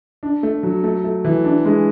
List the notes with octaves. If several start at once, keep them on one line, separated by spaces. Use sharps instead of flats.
D4
A3
F#3
A3
A3
E3
D4
G#3